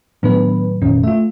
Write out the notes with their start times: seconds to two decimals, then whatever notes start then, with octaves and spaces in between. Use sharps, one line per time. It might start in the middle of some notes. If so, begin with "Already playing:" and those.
0.23 A2 D#3 F#3 B3 D4 B4
0.82 F1 A#2 D#3 C#4
1.03 A3 F4 E5